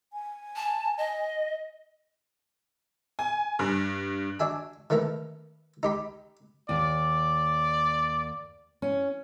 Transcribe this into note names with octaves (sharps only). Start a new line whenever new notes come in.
G#5
A5
D#5
G#5
G2
D4 F#4 E5 G#5
D#3 A3 B3 E4 A#4
D#4 G4 B5
D#2 D5
C#4